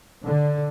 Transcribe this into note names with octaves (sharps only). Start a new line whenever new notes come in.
D3